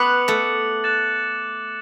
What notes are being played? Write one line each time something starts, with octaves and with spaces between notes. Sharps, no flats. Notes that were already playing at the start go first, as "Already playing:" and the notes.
Already playing: B3 B4 D6 F#6 C#7 F#7
A3 A4
F#6 A6 E7